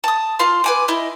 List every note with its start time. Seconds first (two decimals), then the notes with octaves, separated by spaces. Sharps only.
0.04 A5 D#6
0.39 F4 F5 C6
0.64 B4 G#5 D6
0.88 E4 D#5